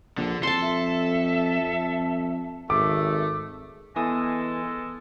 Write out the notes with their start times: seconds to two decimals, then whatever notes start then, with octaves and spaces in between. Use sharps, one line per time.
0.18 A#1 D3
0.43 F2 A4 A5 C6
0.61 E5
1.61 F2
2.70 G#1 A3 D6
3.96 E3 G#3 B3 A4 G#5 D#6